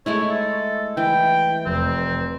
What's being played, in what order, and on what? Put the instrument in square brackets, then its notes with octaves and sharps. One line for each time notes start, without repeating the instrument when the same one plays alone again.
[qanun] G#3 A3 E4 [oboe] C#5
[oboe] A4
[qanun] E3 [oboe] G5
[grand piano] F1 [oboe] C4